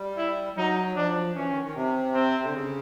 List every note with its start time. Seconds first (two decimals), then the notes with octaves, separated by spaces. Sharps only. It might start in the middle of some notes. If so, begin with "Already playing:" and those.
Already playing: G3
0.17 E4
0.57 F#3 D#4
0.96 F3 D4
1.35 E3 C#4
1.49 D#3
1.62 D#3
1.75 C3
2.14 C4
2.43 D3
2.54 C#3